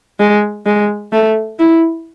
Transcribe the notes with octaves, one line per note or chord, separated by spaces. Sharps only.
G#3
G#3
A3
E4